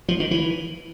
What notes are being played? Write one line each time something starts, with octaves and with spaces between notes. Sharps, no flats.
F3
D#3
E3